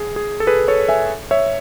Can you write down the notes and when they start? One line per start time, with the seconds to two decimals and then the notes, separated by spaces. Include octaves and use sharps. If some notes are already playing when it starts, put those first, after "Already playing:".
Already playing: G#4
0.16 G#4
0.40 A4
0.47 G#4 B4
0.68 A4 C#5
0.88 E5 G#5
1.31 C#5 E5